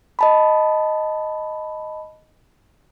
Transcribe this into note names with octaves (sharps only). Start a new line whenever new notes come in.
D#5 A5 B5